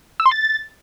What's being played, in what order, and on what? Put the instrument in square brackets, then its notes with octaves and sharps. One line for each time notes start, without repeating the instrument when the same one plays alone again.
[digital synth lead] E6
C6
A6